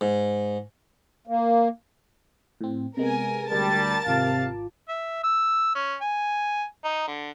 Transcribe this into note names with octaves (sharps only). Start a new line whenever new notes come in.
G#2
A#3
A2 C4
C3 G#3 B3 A#4 G#5
D2 G3 A#4 A5 A6
G#1 C3 F4 F5 D6
E5
E6
C#4
G#5
D#4
D3